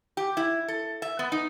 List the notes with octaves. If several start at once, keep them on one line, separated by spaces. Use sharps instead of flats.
G4
E4
A4
E5
B3
D#4